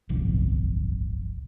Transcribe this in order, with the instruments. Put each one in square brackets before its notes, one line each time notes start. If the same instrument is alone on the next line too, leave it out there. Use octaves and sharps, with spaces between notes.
[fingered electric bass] D1 G1 C2 F3